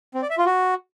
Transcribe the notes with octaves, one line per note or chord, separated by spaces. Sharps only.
C4
D5
E5
F4
F#4